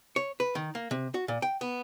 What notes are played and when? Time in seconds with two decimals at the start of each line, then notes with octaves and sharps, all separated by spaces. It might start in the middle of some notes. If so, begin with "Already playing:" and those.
0.16 C#5
0.40 B4
0.55 D#3
0.75 A#3
0.91 C3
1.14 F#4
1.28 A#2
1.42 G5
1.61 B3